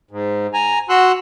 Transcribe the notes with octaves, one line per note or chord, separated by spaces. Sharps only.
G#2
G#5 A#5
F#4 F#5 C6 E6 F#6